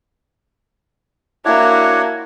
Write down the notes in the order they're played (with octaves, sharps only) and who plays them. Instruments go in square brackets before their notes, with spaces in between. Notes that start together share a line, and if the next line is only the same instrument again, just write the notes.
[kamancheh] A#3 E4 [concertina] D4 F#4 C#5